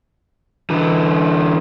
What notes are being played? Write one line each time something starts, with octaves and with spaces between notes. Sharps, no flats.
D3 E3